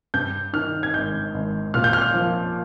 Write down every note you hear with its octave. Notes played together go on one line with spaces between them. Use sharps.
G2 G6
D#3 F6
G#6
G#1 G6
G#1
A#2 F6
G6
F6
F3